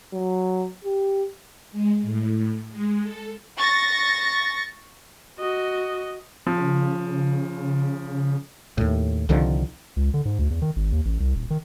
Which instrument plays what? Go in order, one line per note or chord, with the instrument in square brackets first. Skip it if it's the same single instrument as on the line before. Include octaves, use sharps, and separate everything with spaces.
[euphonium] F#3
G4
[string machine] G#3
A2
G#3
A4
[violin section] C#6 A6 A#6
[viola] F#4 D#5
[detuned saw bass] C#3 [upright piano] F3
[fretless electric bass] D#2 A2
C2 D3 D#3 F3
[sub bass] C#2
D3
G#2
D2
E2
D#3
G#1
D#2
A1
C2
D#1
D#3